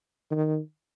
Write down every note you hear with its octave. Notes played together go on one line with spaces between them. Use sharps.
D#3